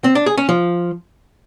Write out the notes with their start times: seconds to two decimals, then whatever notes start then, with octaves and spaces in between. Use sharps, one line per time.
0.04 C4
0.15 D4
0.26 G#4
0.38 C#4
0.49 F3